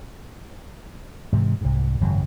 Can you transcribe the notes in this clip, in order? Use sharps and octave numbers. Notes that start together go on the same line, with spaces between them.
G#2 C3 E3
C2 G#2
G#1 F#2 C#3 F#3